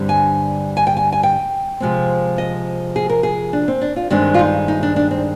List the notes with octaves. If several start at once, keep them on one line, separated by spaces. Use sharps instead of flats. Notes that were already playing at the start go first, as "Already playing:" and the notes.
Already playing: G2 D3 G3 C4
G#5
G#5
G5
G#5
G#5
G5
C3 F3 G#3 C4
D#5
G#4
A#4
G#4
D4
C4
D4
F4
G2 D#3 G#3 C4 D4
F4
D#4
D#4
D4
D4
C4